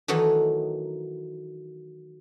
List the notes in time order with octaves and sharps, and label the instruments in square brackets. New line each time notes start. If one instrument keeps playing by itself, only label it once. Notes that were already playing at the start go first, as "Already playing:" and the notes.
[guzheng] D#3 E3 F#3 A3 D#4